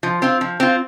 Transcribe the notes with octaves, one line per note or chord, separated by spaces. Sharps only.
F3
C4 F4
F3
C4 F4